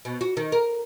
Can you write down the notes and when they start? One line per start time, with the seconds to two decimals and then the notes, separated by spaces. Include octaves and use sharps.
0.05 B2
0.21 F#4
0.37 D#3
0.52 A#4